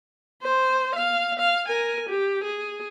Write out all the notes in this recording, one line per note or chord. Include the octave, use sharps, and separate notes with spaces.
C5
F5
F5
A#4 G#5
G4
G#4